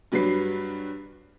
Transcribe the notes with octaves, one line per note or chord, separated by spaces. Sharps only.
G2 F#3 G3 B4 C7